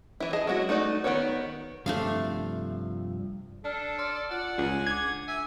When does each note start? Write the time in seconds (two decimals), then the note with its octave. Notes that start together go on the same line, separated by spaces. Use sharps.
0.20 E3 E4
0.33 G#4 D#5 A5
0.47 F#3 G#3 D#4 E4 F#4
0.69 A3 D#4 F#4 D5
1.04 D#3 B3 C4 F#4 C#5
1.86 G2 C3 F3 A3 D4 F5
3.64 D4 A4 D5 A5 F6
3.99 D5 C6 F6
4.31 F4 D5 F#5
4.58 C#2 G#4
4.86 D4 D6 G#6
5.28 E5 G#5